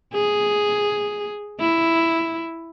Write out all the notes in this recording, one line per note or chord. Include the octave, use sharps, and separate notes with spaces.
G#4
E4